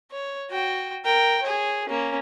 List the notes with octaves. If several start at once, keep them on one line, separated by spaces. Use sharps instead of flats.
C#5
F#4 G5
A#4 G5
G#4 C#5
A#3 C#4